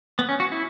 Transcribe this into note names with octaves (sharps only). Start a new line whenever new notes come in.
B3
C#4
F#4
E4